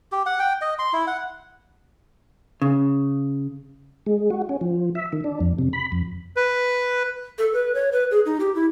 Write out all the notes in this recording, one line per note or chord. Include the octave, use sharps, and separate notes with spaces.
G4
F#5
G5
D#5
C6
E4
F#5
C#3
G#3
F#4
C#4
F3
E5
D#3
D4
F2
C3
B5
F2
B4
A4
B4
C#5
B4
G#4
D#4
G4
E4